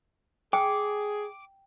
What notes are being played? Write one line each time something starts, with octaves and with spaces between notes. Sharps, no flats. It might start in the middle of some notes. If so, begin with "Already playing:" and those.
G#4 G5 D6